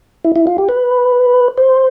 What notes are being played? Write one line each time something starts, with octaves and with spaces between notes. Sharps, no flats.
E4
E4
F4
G4
B4
C5